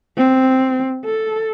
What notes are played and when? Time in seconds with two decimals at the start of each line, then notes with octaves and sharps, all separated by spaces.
0.17 C4
1.05 A4